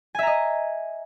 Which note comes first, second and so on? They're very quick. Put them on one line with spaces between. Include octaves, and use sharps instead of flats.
G#5 E5 A#5 D#5